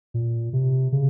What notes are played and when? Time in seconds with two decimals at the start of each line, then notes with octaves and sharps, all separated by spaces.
0.14 A#2
0.53 C3
0.92 C#3